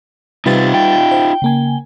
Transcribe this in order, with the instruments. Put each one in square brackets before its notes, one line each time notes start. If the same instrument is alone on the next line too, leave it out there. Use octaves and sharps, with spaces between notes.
[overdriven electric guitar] C3 [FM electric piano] G3 B4 A6 [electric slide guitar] D#4 F4
[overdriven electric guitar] G5
[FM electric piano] C5
C#3 A#3 G#5